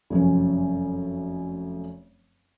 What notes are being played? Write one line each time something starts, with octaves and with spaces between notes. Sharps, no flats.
F1 F#2 C#4